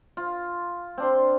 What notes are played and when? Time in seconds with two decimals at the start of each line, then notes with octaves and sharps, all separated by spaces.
0.17 F4
0.98 C4 D4 C6